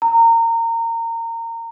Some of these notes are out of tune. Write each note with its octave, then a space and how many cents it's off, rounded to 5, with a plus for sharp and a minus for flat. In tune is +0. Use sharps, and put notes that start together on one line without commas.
A#5 -25